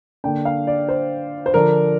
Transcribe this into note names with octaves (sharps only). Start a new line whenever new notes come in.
D3 A#3 D4 G5
F5
D5
C5
C5
D3 F3 D4 A#4